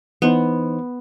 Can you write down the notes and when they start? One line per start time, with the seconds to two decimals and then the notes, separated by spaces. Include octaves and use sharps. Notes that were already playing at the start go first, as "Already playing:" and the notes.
0.22 E3 B3 D#4 C5